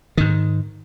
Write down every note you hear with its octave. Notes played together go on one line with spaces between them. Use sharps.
G#2 D#3